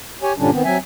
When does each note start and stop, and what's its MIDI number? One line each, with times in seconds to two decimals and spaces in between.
0.23 0.33 67
0.23 0.33 73
0.23 0.33 80
0.38 0.50 43
0.38 0.50 46
0.38 0.50 50
0.38 0.50 55
0.38 0.50 61
0.38 0.50 62
0.52 0.63 51
0.52 0.63 59
0.52 0.63 60
0.64 0.78 54
0.64 0.78 60
0.64 0.78 76
0.64 0.78 80